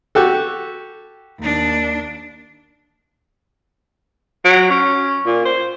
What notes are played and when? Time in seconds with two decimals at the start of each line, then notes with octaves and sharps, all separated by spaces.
0.15 F#4 G4 A4
1.39 D#2 D4
4.44 F#3
4.70 C#4
5.26 A#2
5.45 C5